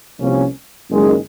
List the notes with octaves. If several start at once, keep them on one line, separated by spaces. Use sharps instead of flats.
C2 C3 F3 A#3 C#4
F#1 F#2 D#3 G#3